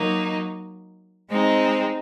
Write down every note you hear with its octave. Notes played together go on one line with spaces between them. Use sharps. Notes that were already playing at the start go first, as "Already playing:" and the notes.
Already playing: F#3 A#3 D#4
G#3 C4 D#4